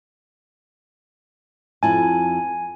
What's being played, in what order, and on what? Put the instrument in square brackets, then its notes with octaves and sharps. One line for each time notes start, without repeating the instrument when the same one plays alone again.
[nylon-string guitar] F2 E4 A5 [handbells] G#5